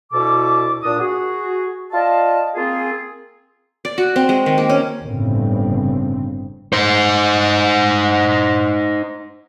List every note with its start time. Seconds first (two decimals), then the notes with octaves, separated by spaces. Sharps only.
0.12 D2 B2 E4 A4 D6
0.83 A#2 D4 D#6
1.00 F#4 G#4
1.92 F4 D5 D#5 A5
2.55 A#3 C4 F4 G#4
3.85 D5
3.98 F#4
4.16 C4
4.29 G#3
4.46 D#3
4.58 A#3
4.69 C#4
5.02 G1 A2 C#3 C4
6.73 D#4 C5